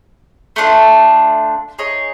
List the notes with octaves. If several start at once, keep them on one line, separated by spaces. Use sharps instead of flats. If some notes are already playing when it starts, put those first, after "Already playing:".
A3 D4 F4
D#4 G#4 C#5